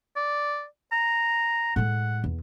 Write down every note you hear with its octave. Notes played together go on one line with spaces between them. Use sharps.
D5
A#5
A2 G#3 F#5
E2